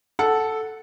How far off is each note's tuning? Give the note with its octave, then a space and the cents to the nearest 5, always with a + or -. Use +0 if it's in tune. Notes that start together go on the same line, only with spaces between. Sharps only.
A4 -5 F#5 +0